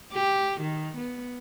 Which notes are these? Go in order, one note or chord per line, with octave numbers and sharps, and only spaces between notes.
G4
D#3
B3